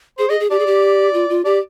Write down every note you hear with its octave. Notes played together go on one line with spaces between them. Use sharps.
G#4 C5
G#4 D#5
G#4
G4 D5
G#4
G4
F4
F4
G4 D5